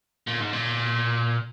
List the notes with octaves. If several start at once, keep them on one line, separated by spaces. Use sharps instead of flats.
A#2
G#2
A#2